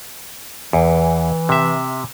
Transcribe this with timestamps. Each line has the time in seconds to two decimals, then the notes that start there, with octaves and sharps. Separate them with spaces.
0.73 E2 E3
1.49 C3 E5